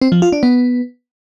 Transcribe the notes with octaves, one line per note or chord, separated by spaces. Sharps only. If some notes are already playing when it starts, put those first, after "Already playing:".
C4
F3
F4
D4
B3